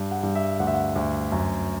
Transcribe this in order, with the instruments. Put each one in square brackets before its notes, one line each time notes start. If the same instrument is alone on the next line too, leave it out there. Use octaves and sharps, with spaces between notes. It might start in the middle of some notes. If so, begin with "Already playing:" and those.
Already playing: [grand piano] G2
F#5
G2
E5
D2 F#5
E5
F#5
D2
F#2